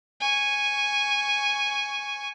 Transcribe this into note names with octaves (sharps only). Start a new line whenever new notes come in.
G#5 C#6